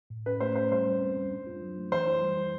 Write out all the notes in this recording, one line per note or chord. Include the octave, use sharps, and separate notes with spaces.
A2
C#4 B4
A3 C5
C#4 C5
G3 C5
G3
C4
G3
D4
F4
F#3
A3
E3 C5
E4
G3
E4